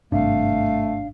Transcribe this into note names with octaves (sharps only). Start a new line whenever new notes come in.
G#1 G2 C3 A3 D4 F5